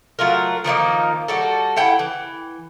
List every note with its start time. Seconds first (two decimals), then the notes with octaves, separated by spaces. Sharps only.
0.19 F#3 A3 F4 A#4
0.64 D#3 F3 A#3 D#4
1.28 G3 F#4 A4
1.76 E4 F#5 G5
1.99 E3